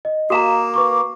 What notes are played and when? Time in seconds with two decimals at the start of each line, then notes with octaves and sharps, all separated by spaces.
0.05 D#5
0.30 A#3 F#4 F5 A#5 D#6 E7
0.74 B4 C#6 D6